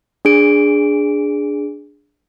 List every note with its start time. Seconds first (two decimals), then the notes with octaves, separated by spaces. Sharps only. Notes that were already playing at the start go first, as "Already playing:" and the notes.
0.25 D4 G#4 D7